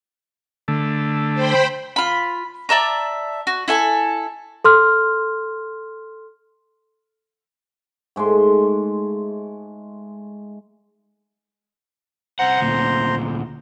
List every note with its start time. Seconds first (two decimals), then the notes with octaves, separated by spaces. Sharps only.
0.68 D3 A3
1.34 C5 G5 B5
1.96 F4 B5
2.69 D5 E5 A5 A#5
3.47 F#4
3.68 E4 A4 G#5
4.64 A4 C6 F6
8.16 G#2 G#3 A3 C6
12.39 C2 C5 F#5 A#5 C6
12.60 D2 A#2